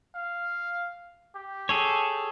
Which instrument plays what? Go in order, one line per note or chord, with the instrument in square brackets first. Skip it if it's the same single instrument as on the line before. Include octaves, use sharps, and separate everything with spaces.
[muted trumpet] F5
G4
[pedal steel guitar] G#4 A4 C#5